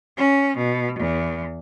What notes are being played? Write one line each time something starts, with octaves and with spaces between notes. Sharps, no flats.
C#4
B2
E2